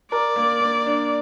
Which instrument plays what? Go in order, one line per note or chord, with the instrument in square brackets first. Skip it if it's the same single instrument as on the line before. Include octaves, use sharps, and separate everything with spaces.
[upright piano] A#4 [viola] D5
[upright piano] A#3
A#3
D4